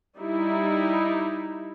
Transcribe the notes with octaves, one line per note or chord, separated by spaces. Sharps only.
G3 D#4 E4